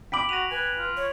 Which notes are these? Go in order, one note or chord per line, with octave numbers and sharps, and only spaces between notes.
G5 B5 D6 B6 D7 F#7
F#4 A#6 D#7 F7
B4 G#5
F4
C#5